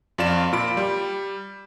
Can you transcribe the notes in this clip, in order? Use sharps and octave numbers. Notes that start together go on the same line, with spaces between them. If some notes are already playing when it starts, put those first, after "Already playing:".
F2 F4 D5 E7
A#2 F4 B5 D7
G3